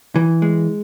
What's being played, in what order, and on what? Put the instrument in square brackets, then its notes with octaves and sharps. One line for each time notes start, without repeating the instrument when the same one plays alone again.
[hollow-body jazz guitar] E3
G#3